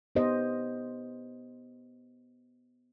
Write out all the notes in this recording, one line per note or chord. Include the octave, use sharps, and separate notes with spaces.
B3 G4 C5 D#5